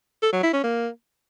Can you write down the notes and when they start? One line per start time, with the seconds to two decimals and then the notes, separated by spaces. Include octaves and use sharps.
0.22 A4
0.33 F#3
0.43 E4
0.53 C#4
0.63 A#3